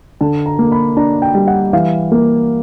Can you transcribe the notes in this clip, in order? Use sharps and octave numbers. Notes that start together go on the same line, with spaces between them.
D3 A5
A#5
A#3
B5
D4 A#5
G5
G3
F#5
E3 F5
A#3